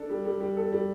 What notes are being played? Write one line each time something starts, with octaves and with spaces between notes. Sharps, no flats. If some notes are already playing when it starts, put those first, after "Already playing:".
Already playing: D4 A4
G3
G3
G3
A4
G3